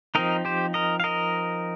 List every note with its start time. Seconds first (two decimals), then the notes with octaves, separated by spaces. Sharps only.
0.15 F3 C4 D#4 A#4 D#5
0.45 G4 C5
0.74 A#4 D#5
1.00 F5
1.04 A#4 D#5